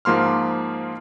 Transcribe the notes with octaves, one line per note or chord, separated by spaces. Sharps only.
G#2 F3 A#3 C6 F6